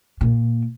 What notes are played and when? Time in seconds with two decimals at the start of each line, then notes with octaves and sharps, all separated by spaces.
0.21 A#2